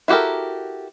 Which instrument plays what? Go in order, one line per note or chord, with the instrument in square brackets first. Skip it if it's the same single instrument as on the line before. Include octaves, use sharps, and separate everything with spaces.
[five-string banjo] E4 F#4 G4 A4 A#4